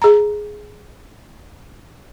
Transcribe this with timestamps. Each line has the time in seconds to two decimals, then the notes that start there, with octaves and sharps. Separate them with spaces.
0.02 G#4 A#5